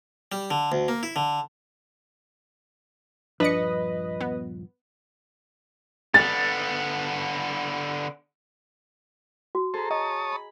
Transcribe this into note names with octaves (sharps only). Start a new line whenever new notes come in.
G3
D3
D2
A#3
E4
D3
D#1 G2 F3 D4 B4 D#5 C#7
B3
D3 B3 A6
F#4
G#4 A4 C5 A#5
C#5 D#5 A5 D#6
B5